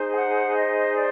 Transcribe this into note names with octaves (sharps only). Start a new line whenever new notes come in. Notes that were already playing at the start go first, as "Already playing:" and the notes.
Already playing: D#4 G#4 C5
G5
F#5
D#5
D5